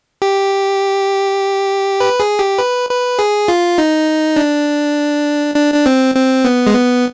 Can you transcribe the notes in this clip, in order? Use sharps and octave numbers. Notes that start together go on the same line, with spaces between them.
G4
B4
G#4
G4
B4
B4
G#4
F4
D#4
D4
D4
D4
C4
C4
B3
G#3
B3